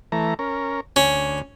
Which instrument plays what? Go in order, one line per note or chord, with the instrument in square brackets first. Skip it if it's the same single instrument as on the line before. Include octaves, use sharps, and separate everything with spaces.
[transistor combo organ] E3 A3 A#5
C#4 A#4
[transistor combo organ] D2 [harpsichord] C#4